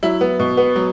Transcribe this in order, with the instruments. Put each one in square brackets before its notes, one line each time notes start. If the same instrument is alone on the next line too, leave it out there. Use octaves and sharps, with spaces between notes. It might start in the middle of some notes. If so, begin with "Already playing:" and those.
[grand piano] F#3 E4
B3
B2
B3
F#3